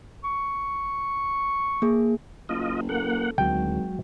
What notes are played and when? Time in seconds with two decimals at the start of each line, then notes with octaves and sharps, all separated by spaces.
0.24 C#6
1.82 A#3 G#4
2.49 F#1 F4 D#5
2.89 A#3 A4 F#5
3.38 G#1 D2 F#3 G#3 F#4 G5